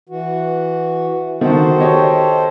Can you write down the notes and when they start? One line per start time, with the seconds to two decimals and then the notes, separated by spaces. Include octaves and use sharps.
0.09 E3 F#4
1.41 D#3 F#4 A4 C5
1.80 G4 C#5 D#5